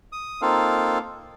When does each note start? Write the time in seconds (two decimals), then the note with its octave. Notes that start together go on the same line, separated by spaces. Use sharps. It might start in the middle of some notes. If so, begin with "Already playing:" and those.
0.12 D#6
0.42 A#3 C4 D#4 F4 A4 F5